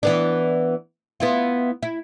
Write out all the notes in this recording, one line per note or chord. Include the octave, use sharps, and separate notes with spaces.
E3 B3 D4
B3 E4 F4
E4